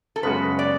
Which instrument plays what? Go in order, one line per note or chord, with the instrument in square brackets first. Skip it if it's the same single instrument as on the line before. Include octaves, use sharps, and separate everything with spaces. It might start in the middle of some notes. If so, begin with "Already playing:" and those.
[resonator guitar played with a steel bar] A4
[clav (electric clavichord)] F#2 C#3 G#3 B3 F#4 [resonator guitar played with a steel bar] B4
[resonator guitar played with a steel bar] D5